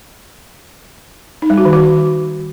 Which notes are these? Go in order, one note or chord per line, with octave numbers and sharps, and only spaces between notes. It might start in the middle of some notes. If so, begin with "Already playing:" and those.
D#4
G3
F#4
D#3
F#4